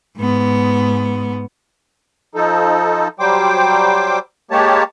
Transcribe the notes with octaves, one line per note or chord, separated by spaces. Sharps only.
G#2 B3
F3 D#4 A4
F#3 G3 C5 G5 D6
G#3 A#3 G4 C#5 A5